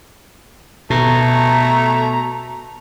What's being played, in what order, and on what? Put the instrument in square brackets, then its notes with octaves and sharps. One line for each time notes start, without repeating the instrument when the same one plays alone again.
[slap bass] B2 [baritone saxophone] A3 [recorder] A#5